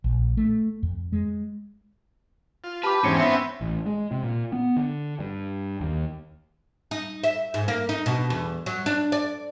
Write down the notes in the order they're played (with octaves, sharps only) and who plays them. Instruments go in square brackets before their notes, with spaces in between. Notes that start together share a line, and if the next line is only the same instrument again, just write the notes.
[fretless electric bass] A#1
A3
F2
G#3
[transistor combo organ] F4
[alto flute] G4 [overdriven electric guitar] B4 [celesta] A5 D6
[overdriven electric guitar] E2 G#2 [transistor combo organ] C4 C#4 [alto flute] C#5 [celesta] C#7 D#7
[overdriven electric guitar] B3 [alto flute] E5 [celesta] C6 A#6
[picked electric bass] A1
G#3
C3
A#2
B3
D3
G2
D#2
[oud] D#4
E5
G#2
A#3
D#4
B2
E2
F#3
D4
D5